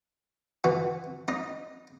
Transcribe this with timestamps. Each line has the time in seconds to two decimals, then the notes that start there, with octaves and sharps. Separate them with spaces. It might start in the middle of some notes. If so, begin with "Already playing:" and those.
0.64 E3 F#4
1.28 D#4 D#5